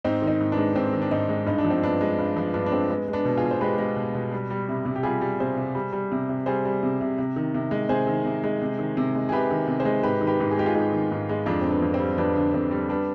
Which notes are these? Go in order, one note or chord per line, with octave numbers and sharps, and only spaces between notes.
G#2 C4 D#4
D#3
C4 D#4
G#2
B3 D4
G#3
G#2 C4
D#3
D4
G#2 C4 D#4
G#3
G2 D#4
D4
F3
C4
G2 B3 D4
G#3
G2
F3 B3
G2 B3 D4
D4
G#3 C4
G#3 B3
G#3
B3 D4
B2
F4 G#4
B2
C5
G#3 G4 B4
G#3
B2
B2
G3
G3
C3
C3
G4
G3 F4 G#4
G3
C3 G#4 C5
C3
G3
G3
C3
C3
G3 G#4 C5
G3
C3
C3
C3
D#3
C3
G#3
C3 G#4 C5
D#3
C3
G#3
C3
D#3
C3
G#3
G#4
C3 G4 B4
D#3
C3
G#4 C5
G#3
G#2 G4 B4
D#3
G4 B4
G#2
G#4
G#3 G4
F4 G#4
G#2 D#4 G4
D#3
G#2
G#3
F2 D4 F4
D3 C4
B3 D4
F2
C4
G3
F2 B3 D4
D3
F2 C4
G3
G3 B3 D4